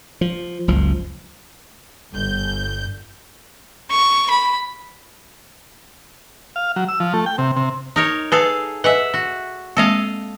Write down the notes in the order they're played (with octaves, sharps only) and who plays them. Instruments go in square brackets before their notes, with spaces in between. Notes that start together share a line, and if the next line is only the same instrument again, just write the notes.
[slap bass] F3
F#1 C#2 F3
[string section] G1 G6
[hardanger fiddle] C#6
B5
[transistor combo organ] F5
F#3
E6
F3
A3
G5
C3
C3
[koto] D#4 A#4 C#5
[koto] G#4 A4 F5 [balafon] B4
[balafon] B4 D#5 G#5 [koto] E5 F#5
[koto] F#4
[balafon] G#3 A#3 C4 [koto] A4 D#5 F5